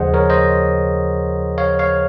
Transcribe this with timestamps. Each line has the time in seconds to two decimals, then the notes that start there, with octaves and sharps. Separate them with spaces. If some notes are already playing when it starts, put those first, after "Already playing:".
Already playing: D#2 C#3 F3 G#4 C5 D#5 F#5
0.14 A#4 C#5
0.30 C5 D#5
1.58 C#5 F5
1.79 C#5 F5